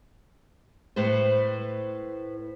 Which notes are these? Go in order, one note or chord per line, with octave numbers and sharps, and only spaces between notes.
A2 B4 C5